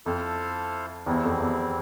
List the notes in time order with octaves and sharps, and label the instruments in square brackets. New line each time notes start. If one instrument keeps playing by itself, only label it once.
[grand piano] F2 [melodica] E4 A4 C5 F5
[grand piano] E2 [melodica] G3 C4 E4
[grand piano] F2
E2